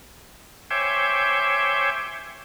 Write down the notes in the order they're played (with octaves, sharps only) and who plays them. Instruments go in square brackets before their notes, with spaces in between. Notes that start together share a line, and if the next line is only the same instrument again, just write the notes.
[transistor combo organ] C5 C#5 E5 G5 G#5 D6